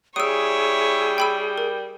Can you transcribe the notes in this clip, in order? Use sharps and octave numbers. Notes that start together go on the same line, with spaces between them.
G3 E4 G#4 C#5 D#6 E6
G5 B5 E6
A#4